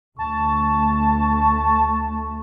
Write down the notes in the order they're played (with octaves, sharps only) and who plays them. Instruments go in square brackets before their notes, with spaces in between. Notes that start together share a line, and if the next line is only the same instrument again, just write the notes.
[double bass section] D2 A3 [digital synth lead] A5 [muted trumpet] C#6